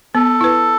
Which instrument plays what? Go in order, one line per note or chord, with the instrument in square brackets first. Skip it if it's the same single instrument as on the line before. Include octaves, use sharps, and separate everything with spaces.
[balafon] B3 [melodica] A4
[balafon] E4 B4